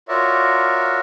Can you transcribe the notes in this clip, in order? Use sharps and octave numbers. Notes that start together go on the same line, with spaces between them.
F4 F#4 A#4 C#5 D5 E5